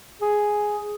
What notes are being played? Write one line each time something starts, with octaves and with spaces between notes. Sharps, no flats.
G#4